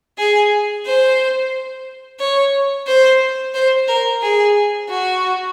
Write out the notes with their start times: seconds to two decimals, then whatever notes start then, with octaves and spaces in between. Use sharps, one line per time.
0.18 G#4
0.86 C5
2.20 C#5
2.87 C5
3.54 C5
3.88 A#4
4.22 G#4
4.89 F#4